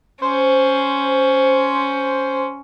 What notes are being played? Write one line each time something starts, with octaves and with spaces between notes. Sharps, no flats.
C#4 C5